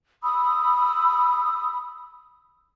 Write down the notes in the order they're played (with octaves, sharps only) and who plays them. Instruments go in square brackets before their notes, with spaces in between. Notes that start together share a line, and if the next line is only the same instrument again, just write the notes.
[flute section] B5 D#6 E6